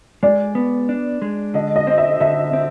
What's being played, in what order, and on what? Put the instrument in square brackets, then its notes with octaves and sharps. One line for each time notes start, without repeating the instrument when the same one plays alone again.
[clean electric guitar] G#3 [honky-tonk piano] D5
[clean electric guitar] B3
D4
G#3
[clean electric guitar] D3 [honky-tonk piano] D#5
[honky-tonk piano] D#5
[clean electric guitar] C4
[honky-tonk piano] E5
[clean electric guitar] D3 [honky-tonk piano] E5
[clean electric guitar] C4